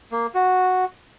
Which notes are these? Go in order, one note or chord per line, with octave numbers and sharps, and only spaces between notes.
A#3
F#4